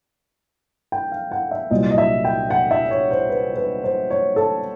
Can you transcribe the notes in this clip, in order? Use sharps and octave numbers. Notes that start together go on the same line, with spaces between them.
G5
F5
F#5
E5
C2 A#2 F#3 D#5
D#5
E5
G5
F#5
E5
C#5
C5
B4
B4
C5
C#5
A4